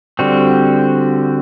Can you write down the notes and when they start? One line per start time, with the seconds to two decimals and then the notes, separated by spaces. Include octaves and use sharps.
0.19 D3 G3 C4 F#4